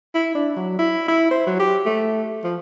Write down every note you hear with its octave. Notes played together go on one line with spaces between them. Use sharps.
E4
D4
F#3
E4
E4
C5
F#3
G4
A3
F3